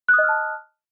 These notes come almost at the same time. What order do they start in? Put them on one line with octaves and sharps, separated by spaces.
F#6 D#6 D#5 F6 A5